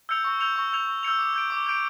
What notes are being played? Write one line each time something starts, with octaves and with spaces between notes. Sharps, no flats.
E6 G6 C#7 F7
C#6
E6 G6 C#7 F7
C#6
E6 G6 C#7 F7
C#6
E6 G6 C#7 F7
D6
G6 D7
D6
G6 D7